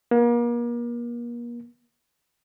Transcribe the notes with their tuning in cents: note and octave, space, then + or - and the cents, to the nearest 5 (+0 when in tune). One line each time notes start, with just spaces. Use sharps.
A#3 +35